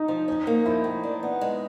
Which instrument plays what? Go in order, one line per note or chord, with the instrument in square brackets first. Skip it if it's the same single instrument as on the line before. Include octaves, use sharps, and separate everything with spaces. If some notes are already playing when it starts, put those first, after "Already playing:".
Already playing: [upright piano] D#4
[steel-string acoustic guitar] F3
C#4
A#3
[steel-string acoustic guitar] F3 [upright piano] E4
[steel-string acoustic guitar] A2
D4
B3
G#3